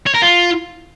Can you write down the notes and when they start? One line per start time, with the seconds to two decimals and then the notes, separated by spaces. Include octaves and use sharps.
0.07 C#5
0.14 A#4
0.22 F4